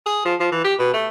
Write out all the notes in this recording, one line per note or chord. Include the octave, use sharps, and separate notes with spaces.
G#4
F3
F3
E3
G4
B2
A3